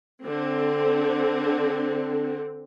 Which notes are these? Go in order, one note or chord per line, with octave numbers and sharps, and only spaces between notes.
D3 C4